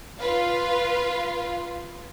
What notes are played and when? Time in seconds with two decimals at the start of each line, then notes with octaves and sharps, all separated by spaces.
0.19 F4 B4 F5